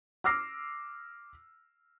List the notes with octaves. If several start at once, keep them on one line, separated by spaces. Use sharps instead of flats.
D6 E6 F6 A#6 C7